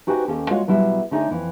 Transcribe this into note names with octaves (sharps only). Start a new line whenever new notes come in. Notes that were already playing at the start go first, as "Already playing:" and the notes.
D#4 F#4 G4 B4 C5 G#5
D#2 C#4 G4 A4
G#3 F4 F#4 C#5 F5 F#5
B2 F#3 G3 E4
D3 A3 D#4 C#5 D5 G#5
F2 E3